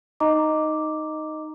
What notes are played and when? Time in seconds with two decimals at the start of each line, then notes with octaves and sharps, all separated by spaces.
0.20 D#4 D#5 A#5 D6